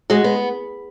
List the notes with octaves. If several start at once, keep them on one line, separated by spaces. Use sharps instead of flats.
G#3 F#4
B3